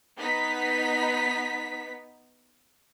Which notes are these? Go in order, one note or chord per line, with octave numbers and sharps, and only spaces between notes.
B3 D#4 B6